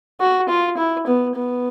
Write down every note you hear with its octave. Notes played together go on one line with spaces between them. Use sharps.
F#4
F4
E4
B3
B3